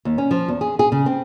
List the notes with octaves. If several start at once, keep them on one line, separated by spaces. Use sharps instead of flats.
D#2
C#4
F3
E2
G#4
G#4
C#3
C4